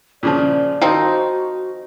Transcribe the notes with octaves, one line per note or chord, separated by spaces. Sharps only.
A#2 C#3 F3 D5
D#3 F3 C4 D#4 F#4